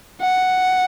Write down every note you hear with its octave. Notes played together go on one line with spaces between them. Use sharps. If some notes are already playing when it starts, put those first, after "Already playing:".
F#5